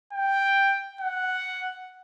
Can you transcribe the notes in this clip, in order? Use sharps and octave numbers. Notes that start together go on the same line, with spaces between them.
G5
F#5